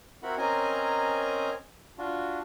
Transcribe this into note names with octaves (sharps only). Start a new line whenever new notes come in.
C4 E4 F#4 A#4 F#5 B5
C4 C#4 A#4 D#5 G#5 A#5
D4 F4 F#4